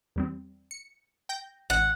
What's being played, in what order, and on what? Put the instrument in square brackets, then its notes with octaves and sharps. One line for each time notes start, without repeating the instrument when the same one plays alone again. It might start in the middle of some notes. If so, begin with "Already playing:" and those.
[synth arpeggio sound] E2 G3 C4
C#7
G5 G6 A#6
[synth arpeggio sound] A1 [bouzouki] F#5